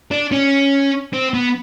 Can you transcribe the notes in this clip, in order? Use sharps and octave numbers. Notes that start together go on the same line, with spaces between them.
D4
C#4
C4
B3